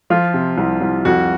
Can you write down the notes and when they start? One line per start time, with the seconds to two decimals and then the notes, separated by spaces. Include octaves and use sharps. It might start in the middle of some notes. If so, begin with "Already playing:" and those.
0.10 F3 F4
0.34 C3
0.58 C2
0.81 C2
1.05 F2 F#4